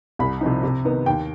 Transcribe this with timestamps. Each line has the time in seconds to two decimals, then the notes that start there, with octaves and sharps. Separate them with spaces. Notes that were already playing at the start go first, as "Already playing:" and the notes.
0.19 C2 B5
0.41 C3 F3 C4 D#4
0.63 C3
0.85 D#3 B3 D#4
1.06 D#2 G5